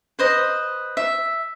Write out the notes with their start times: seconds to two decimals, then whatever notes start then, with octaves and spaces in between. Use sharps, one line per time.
0.19 B4 C5 D#5
0.97 E5